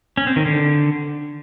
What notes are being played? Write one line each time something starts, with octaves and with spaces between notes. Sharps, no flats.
C#4
C4
D#3
D3